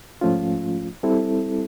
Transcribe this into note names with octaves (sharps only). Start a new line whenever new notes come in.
G#2 F3 A3 C#4 F4
G3 C4 E4 A4